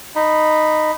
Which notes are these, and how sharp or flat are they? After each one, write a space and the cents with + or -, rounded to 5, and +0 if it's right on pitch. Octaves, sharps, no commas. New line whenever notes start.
D#4 -10 B5 +0